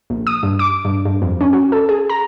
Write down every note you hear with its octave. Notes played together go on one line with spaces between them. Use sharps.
A#1
D#6
G2
D6
G2
G2
F2
C#4
F#4
A4
G#4
A#5